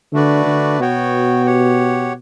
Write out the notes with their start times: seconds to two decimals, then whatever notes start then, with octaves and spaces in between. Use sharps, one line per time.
0.13 D3 A3 D4 F#4 B4 D5
0.46 D3
0.80 B2 B3 F#4 C#5 G5
1.46 G4 C#5 F#5